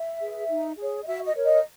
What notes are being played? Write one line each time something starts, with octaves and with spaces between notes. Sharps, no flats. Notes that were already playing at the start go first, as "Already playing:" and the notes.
Already playing: E5
G#4 B4
D#4
G#4 C#5
D#5
F#4 E5
D#5
A#4 C#5
D#5